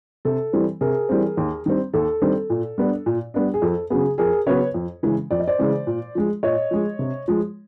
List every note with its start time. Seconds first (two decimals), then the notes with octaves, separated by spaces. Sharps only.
0.25 C3 A4
0.53 E3 G3 C4
0.81 C3 G#4 A#4
1.09 E3 G3 C4
1.37 D#2
1.66 D#3 G3 C4
1.93 D#2 A4
2.22 D#3 G3 C4
2.50 A#2
2.78 G3 B3 D4
3.06 A#2
3.34 G3 B3 D4
3.54 G#4
3.62 F2 A4
3.90 C#3 F#3 B3 G#4
4.18 F2 G#4 A#4
4.47 C#3 F#3 B3 B4 C#5
4.74 F2
5.03 C#3 E3 G#3 C#4
5.31 F2 D5
5.40 D#5
5.47 C5 D5
5.59 C#3 E3 G#3 C#4
5.87 A#2
6.15 F3 G#3
6.43 A#2 C#5 D#5
6.71 F3 G#3
6.99 C3
7.28 F3 G#3